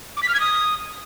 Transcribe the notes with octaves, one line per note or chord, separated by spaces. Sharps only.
D6
B6
F6
G#6
D#6